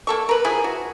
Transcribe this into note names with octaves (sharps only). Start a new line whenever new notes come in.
A#3 A4 C#6
A#4 B4
F3 E4 G#4
F#4